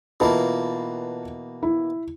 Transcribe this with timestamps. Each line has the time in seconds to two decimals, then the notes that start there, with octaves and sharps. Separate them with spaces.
0.20 B2 E3 A#3 F4 B4 A5
1.63 E4